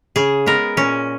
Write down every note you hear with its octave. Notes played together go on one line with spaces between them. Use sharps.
C#3 G#4
G#3 B3 A#4
A#2 C#4